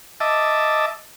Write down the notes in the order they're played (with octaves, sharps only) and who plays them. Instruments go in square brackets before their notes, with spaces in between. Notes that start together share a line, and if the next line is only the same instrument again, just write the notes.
[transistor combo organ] D#5 E5 A5 D6